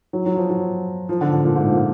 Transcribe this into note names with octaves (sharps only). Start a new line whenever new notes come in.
F#3
F#3
F3
F#3
F3
D3
D3
A#2
G#2
A#2